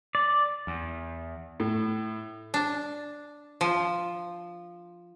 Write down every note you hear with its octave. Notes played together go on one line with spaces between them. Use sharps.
D5
E2
A2
D4
F3